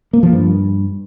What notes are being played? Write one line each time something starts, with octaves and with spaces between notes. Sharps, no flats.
A#3
F3
G2